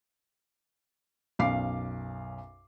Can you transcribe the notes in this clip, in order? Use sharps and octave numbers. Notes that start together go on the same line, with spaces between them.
B1 F#2 F5 D6 C7